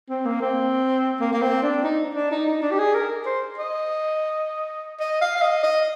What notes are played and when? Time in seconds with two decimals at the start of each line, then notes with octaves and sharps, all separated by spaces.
0.09 C4
0.25 A#3
0.41 C4
1.20 A#3
1.33 A#3
1.42 C4
1.62 D4
1.84 D#4
2.15 D4
2.31 D#4
2.47 D#4
2.62 D4
2.71 G4
2.78 G#4
2.94 A#4
3.26 C5
3.58 D#5
5.00 D#5
5.21 F5
5.37 F5
5.42 D#5
5.63 D#5